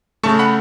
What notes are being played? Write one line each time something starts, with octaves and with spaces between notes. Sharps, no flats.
C#3 A3 A5 C#6
F#5 B5